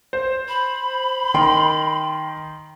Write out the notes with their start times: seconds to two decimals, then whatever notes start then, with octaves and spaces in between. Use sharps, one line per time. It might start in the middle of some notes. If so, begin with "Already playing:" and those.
0.13 C5
0.48 B5
1.34 D#3 G5 C6